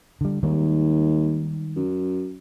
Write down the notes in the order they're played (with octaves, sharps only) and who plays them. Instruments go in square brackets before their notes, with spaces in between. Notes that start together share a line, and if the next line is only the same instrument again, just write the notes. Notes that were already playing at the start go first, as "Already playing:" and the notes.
[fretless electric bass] D3 G3
[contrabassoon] D#2 [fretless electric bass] D#3 G3 G#3
[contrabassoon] F#2